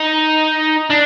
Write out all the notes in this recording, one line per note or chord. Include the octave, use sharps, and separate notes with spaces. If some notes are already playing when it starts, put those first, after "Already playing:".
Already playing: D#4
D4